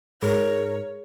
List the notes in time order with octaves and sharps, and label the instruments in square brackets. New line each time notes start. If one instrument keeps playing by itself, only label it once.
[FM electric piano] G#2 [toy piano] G#4 [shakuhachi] A#4 [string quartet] C#5